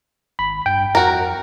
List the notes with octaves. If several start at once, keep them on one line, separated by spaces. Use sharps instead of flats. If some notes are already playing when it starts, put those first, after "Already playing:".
G#1 B5
G2 G5
F2 F#4 A#4